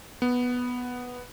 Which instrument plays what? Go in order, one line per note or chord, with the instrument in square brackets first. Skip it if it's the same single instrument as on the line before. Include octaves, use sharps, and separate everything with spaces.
[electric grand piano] B3